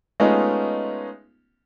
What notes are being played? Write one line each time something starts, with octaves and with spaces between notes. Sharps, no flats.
G#3 A3 B3 C#4 D#4 F4